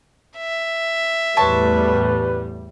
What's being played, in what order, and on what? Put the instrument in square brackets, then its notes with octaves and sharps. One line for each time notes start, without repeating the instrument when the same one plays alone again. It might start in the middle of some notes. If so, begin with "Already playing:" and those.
[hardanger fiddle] E5
[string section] E2 A2 G3 [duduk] B4 [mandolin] C#5 A5 C6